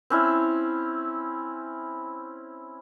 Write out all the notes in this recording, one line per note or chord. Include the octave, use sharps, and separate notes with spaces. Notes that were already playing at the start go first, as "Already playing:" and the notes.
C4 C#4 E4